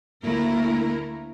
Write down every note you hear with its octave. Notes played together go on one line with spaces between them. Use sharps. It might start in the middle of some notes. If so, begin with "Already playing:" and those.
D2 A3 A#3 E4 A#4